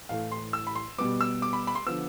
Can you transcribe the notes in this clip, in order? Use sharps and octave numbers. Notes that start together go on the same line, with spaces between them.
A2 E3 A3 F5
C6
E6
B5
C6
B2 G3 B3 D6
E6
D6
B5
B5
C6
D3 F3 B3 E6